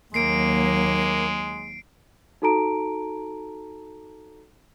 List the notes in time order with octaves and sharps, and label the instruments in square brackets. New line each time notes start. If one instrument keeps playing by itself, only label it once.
[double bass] D#2 F#3 [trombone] G#3 [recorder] A#3 [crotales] C7 D7
[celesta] D#4 F#4 A4 A5 A#5 D7